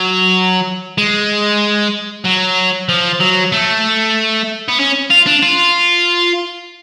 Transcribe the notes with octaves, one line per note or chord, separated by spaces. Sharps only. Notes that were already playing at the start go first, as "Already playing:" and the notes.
Already playing: F#3
G#3
F#3
F3
F#3
A3
B3
C#4
F4
D4
F4